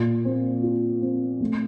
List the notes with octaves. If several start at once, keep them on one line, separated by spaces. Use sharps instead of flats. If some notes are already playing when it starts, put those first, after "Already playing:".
Already playing: A#2
C4
F4
C4
A3